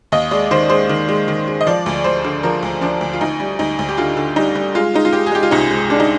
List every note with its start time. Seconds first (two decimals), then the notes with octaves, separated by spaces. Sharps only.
0.12 D#2 D#5
0.31 G#3 D5
0.51 D#3 C5
0.69 G#3 C5
0.89 D#3
1.08 G#3
1.28 D#3
1.47 G#3
1.61 D#5
1.67 F3 D5
1.86 D2
2.04 D2 C5
2.24 D3
2.43 F3 A#4
2.63 D2
2.81 F3 D4
3.01 D2
3.13 F4
3.21 D2 D#4
3.40 G3
3.59 D2 D#4
3.79 D2
3.89 G4
3.97 D3 F4
4.17 D3
4.36 G3 D#4
4.55 G3
4.75 G#3 F4
4.94 G#3 D#4
5.05 F4
5.12 G#3 G4
5.26 G#4
5.32 G#3 G4
5.43 F4
5.51 C2 D#4
5.71 G#3
5.90 G#3 D4
6.00 D#4